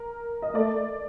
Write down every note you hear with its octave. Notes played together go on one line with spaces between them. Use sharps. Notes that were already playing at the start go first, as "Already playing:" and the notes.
Already playing: A#4
D#5
A3 D5